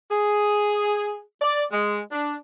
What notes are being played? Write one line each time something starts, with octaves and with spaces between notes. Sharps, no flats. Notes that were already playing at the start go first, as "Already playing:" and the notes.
G#4
D5
G#3
D4